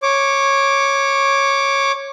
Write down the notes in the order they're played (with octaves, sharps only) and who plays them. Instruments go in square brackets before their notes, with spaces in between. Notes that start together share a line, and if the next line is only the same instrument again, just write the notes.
[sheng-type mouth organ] C#5 D6